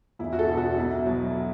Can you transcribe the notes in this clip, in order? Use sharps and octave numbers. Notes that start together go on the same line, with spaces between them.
E1 E4
F#4
A4
E2 B2
F#4
B1 E4
B2 F#3